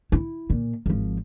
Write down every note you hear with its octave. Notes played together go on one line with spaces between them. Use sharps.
E4
A#2
G#1 F3